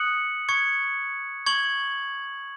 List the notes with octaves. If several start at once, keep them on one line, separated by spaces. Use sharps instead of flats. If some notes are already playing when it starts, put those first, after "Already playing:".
Already playing: D#6 F#6 C#7 F#7
C#6 G#6 C#7
C#6 G#6 F#7